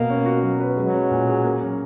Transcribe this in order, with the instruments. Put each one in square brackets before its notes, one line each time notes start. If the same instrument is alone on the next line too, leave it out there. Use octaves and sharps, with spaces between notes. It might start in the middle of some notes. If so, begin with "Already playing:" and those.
Already playing: [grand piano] B2 [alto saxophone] A#3
[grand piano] C#4
F#4
F#3
B4
[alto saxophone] F#3 [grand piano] G#3
[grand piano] C#4
A#2
G#4
A#3
C#4